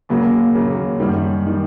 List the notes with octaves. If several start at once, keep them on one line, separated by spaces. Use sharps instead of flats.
D#2 C#3 F#3 A#3
D#2 C#3 F#3 A#3
F#2 D#3 G3
D#3 G3